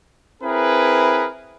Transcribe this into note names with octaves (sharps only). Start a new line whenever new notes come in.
C4 E4 G#4 A#4 B4